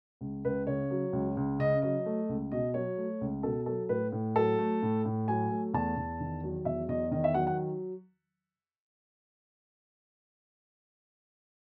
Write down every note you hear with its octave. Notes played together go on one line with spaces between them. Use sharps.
C#2
C#2 B4
C#3 C#5
F#3
C#2
C#2
C#3 D#5
F#3 D#5
A3
C#2
B2 D#5
F#3 C#5
A3
C#2
B2 A4
F#3 A4
A2 B4
A2
F#3 A4
A3
A2
A2
F#3 G#5
A3
E2 A5
E2
D#3
F#3
E2 E5
E2 D#5
D#3 D#5
E5
F#3 F#5
F#5